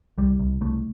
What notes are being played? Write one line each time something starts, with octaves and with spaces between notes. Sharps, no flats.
C2 G3
C2
C2 A3